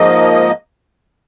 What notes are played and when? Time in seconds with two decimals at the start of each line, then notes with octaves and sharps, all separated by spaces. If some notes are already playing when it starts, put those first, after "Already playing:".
Already playing: G#2 F3 A#3 D#5